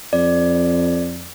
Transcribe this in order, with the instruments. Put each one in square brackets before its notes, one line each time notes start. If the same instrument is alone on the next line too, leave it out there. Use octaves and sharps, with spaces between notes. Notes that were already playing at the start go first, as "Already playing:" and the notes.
[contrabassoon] F2 [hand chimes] D5